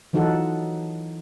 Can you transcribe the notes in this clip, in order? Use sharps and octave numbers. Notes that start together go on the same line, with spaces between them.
E3 F#3 D#4 F4 A4 F#5